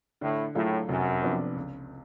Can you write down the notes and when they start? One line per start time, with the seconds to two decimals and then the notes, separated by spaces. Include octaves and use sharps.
0.21 A2 D3
0.55 A2 F#3 A3 F4 G#4
0.89 F1 F#2
1.22 F2 F3 B3 D4
1.56 C#2